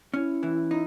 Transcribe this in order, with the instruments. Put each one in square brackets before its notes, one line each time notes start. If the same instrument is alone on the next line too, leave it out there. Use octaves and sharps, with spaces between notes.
[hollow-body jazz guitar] C#4 [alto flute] E4
[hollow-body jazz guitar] E3
D#4